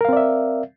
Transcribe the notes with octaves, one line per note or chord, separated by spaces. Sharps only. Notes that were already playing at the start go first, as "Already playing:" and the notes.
C4 A#4 D5 E5 F5